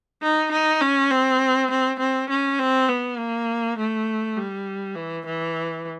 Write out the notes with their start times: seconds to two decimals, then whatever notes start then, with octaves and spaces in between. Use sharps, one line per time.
0.22 D#4
0.52 D#4
0.81 C#4
1.11 C4
1.71 C4
2.00 C4
2.30 C#4
2.59 C4
2.89 B3
3.19 A#3
3.78 A3
4.37 G3
4.96 E3
5.26 E3